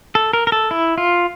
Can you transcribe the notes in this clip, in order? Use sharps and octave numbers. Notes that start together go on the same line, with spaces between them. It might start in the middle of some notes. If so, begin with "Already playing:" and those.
A4
A#4
A#4
A4
E4
F4